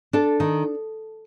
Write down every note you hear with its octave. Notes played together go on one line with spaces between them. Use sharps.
D4 A4
D#3